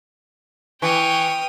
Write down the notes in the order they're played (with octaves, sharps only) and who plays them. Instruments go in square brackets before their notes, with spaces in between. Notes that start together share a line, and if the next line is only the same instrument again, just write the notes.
[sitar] E3 [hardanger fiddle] G5 [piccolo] C#6 [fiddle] D#6 F6